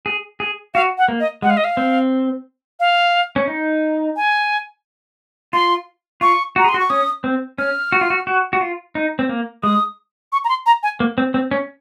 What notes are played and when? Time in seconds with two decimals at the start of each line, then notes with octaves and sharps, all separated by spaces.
0.06 G#4
0.40 G#4
0.74 F#4 F5
0.98 F#5
1.08 A#3
1.20 D#5
1.42 G#3 F#5
1.50 F5
1.57 D#5
1.64 F5
1.77 C4
2.80 F5
3.36 C#4
3.48 D#4
4.16 G#5
5.53 F4 C6
6.21 F4 C#6
6.56 F#4 A#5
6.64 G#4
6.69 C6
6.74 F#4
6.79 C#6
6.90 C#4 D#6
7.24 C4
7.58 C#4 F6
7.92 F#4
8.01 F4
8.10 F#4
8.27 F#4
8.53 F#4
8.61 F4
8.95 D#4
9.19 C4
9.29 A#3
9.63 G#3 D#6
10.32 C#6
10.44 A#5
10.49 C6
10.66 A#5
10.83 G#5
11.00 A#3
11.18 C4
11.34 C4
11.51 C#4